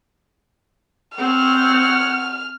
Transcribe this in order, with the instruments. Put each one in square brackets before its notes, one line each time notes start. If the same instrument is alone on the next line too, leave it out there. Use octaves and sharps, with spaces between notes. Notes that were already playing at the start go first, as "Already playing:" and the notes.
[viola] C4 [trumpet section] C#5 F#5 [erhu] F6